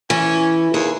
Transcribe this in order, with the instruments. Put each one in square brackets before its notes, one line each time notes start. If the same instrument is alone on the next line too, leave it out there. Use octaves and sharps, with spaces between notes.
[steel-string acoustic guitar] E3 [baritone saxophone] C#4
[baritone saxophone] D#2 [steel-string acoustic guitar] G#4